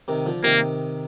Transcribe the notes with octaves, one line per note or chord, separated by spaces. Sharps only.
C3 D#3
D3 F3
C3 D#3 A#3